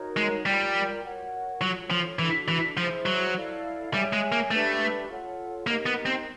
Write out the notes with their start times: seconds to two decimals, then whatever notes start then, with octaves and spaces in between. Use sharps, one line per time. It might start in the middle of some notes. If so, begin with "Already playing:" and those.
Already playing: D#4 F#4 A#4 C#5
0.17 G#3
0.45 G3 F4 A#4 D5 G5
1.03 F#4 A#4 C#5 F#5
1.61 F#3 F4 A4 C#5
1.91 F3
2.19 E3 D4 F#4 A4
2.48 E3
2.77 F3 E4 G#4 C5
3.06 F#3
3.35 E4 A4 D5 F5
3.93 G3 G#4 C#5 E5 G#5
4.13 G#3
4.32 A#3
4.51 A3 D4 G4 B4 E5
5.09 F4 A4 C#5 F#5
5.67 A#3 D#4 G4 A#4 D#5
5.86 B3
6.06 C4